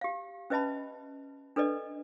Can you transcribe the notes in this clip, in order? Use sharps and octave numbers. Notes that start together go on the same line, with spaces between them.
G4 F5
C#4 B4 D#5 E5 A5 B5
D4 A4 B4 D5 D#5